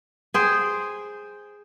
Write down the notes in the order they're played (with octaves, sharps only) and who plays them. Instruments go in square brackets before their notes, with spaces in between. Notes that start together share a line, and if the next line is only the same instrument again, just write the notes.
[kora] G#4 C5 G5